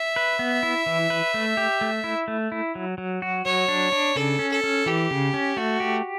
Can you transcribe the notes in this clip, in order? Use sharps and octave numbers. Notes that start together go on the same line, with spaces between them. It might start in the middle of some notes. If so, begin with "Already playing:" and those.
Already playing: E5
B4
B3
E4
E3
B4
A3
G4
A3
E4
A3
E4
F#3
F#3
F#4
F#3 C#5
D4
D4
C#3 A4
C#4
A4
C#4
E3 G4
C#3
C#4
A3 F#4
G4